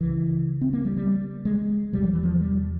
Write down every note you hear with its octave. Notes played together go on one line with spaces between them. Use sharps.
C#2 C#3 E3
C4
A#3
G3
G3
G#3
E2 C3 G3
F3
E3
F3
G3